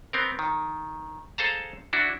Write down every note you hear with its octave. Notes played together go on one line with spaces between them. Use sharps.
B3 C4 A#4
D#3
G#4 A4 C5 F5 A5 A#5
D4 E4 F#4